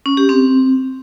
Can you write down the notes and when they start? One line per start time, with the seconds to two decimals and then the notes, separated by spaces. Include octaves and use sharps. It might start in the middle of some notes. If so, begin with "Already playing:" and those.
0.06 C#4
0.17 G4
0.29 C4